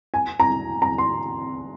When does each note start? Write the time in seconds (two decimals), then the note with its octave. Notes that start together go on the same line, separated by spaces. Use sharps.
0.14 G#5
0.40 A#5
0.82 A#5
0.98 C6